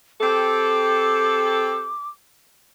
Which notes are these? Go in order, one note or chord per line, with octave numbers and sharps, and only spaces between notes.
C4 G4 A4 D6